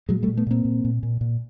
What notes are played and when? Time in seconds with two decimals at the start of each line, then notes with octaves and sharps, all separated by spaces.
0.09 A#2 F#3 G#3
0.23 G3 A3
0.28 A#2
0.37 A3 B3
0.47 A#2 A#3 C4
0.65 A#2
0.85 A#2
1.03 A#2
1.21 A#2